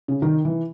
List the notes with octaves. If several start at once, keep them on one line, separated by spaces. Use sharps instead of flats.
C#3
D#3
E3